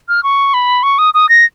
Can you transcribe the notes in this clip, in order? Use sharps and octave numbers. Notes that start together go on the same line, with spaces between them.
F6
C#6
B5
C#6
D#6
D#6
A#6